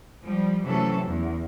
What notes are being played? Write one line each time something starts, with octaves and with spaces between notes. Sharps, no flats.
F3 G3
C3 E3 F#3 A3 C#4 A4
E2